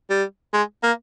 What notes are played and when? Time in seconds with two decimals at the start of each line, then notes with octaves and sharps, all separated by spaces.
0.10 G3
0.53 G#3
0.83 A#3